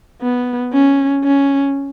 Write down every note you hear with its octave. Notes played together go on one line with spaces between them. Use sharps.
B3
C#4
C#4